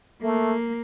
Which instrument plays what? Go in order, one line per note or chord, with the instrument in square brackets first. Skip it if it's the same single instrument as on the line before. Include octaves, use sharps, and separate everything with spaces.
[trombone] A3 [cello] A#3